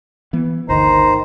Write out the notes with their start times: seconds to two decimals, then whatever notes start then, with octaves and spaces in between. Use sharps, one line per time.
0.33 E3 B3
0.69 G1 D2 D#3 C5 A#5